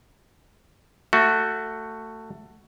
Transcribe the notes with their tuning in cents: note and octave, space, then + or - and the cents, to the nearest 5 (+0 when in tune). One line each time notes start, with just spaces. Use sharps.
A3 +15 F#4 +0